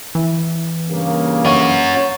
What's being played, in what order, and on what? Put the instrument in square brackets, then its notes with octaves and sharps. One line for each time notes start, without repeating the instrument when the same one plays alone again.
[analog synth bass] E3
[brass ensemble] G2 C#3 A#3
[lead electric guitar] C#4 F#4